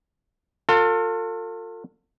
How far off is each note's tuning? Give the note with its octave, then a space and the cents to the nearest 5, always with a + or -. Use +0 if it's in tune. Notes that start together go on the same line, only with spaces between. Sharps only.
F4 +30 A4 +40